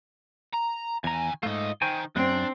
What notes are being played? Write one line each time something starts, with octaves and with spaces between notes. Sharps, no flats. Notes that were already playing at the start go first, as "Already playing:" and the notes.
A#5
E2 D#3 G#5 A#5
G#2 A3 F4 D#5
D#3 C5 G5 G#5
F#2 C4 D4